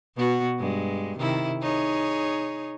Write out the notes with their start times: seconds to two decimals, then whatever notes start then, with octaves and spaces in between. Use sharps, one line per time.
0.16 B2 B3 F#4
0.59 G2 G#3
1.18 C3 D#3 E4
1.61 D#4 G#4 C#5